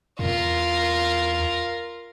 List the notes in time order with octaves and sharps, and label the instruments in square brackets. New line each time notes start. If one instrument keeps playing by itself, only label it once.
[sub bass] E2 [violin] F4 A#4